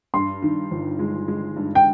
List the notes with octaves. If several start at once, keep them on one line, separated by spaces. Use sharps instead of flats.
G2 C6
D#3
G1
G#3
G#3
G2
G5